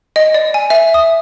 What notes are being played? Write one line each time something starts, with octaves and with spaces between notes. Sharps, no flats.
D#5
D5
G#5
E5
D#6